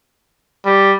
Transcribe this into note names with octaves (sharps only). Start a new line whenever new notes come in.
G3